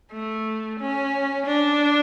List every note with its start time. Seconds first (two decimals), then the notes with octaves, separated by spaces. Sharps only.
0.13 A3
0.79 C#4
1.46 D4